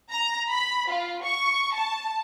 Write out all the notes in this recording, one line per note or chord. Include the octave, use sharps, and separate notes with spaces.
A#5
B5
F4
C#6
A5